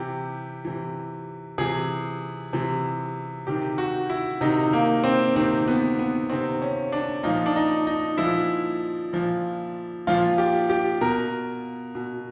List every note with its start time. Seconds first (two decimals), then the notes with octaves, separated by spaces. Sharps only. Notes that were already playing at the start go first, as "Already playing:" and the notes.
Already playing: C3 E3 G4
0.65 C3 E3
1.58 C3 E3 G#4
2.53 C3 E3
3.47 C3 D#3 G4
3.78 F#4
4.10 E4
4.41 C3 D#3 D#4
4.73 A#3
5.04 C4
5.36 C3 D#3 C4
5.68 B3
5.99 B3
6.29 C3 D#3 C4
6.62 C#4
6.92 D4
7.23 A#2 F3 D#4
7.46 D4
7.56 D#4
7.87 D#4
8.18 A#2 F3 E4
9.13 A#2 F3
10.07 A#2 F3 F4
10.38 G4
10.70 G4
11.01 B2 A#4
11.95 B2